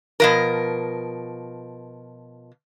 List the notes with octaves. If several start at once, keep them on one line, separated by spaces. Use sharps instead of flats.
B2 F3 A#4